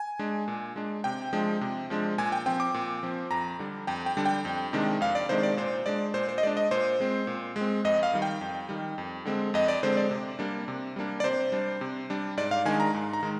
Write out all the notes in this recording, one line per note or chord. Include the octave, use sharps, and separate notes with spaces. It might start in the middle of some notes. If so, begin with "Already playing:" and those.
Already playing: G#5
G#3 D4
A#2
G#3 D4
C3 G5
F3 G#3 D4
C3
F3 G#3 D4
A#2 G#5
G5
F3 C4 G5
D6
A#2
F3 C4
F2 A#5
D3 G3 D4
F2 G5
G5
D3 G3 D4
G5
F2
C3 D#3 G#3 D4
F2 F5
D5
C3 D#3 G#3 D4 C5
D5
A#2 C5
G#3 D4 D5
A#2 C5
C5
D#5
G#3 D4 D5
D#5
A#2 C5
G#3 C4
A#2
G#3
C4
F2 D#5
F5
D#3 G3
G5
F2
D#3 G3
F2
D3 G#3 C4
F2 D#5
D5
D3 G#3 C4 C5
D5
C3
G3 A#3 D4
C3
G3 A#3 D4
D5
C3 C5
G3 D4
C3
G3 D4
G#2 D5
F5
D#3 G#3 D4 G#5
A#5
G#2
A#5
D#3 G#3